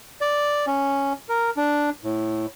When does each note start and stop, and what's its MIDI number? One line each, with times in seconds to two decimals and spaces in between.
0.21 0.66 74
0.67 1.13 61
1.29 1.50 70
1.57 1.90 62
2.04 2.46 45